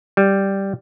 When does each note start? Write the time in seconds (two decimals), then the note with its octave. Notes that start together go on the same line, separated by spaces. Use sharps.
0.17 G3